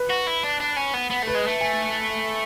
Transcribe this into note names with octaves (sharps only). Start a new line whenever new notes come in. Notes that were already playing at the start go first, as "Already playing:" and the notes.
Already playing: B4
F#4
E4
D4
D4
C#4
B3
B3
A3 B4
G#3
A3
G#5